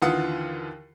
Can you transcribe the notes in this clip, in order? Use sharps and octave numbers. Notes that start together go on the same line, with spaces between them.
D#2 D3 E3 F4 F#5 D#6